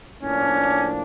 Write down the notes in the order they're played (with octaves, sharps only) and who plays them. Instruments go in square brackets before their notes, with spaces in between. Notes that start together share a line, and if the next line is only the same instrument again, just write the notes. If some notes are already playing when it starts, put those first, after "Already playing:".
[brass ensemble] A2 F3 A#3 D4 [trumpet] C#4